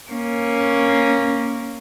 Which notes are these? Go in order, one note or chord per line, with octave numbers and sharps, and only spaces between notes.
A#3 C#4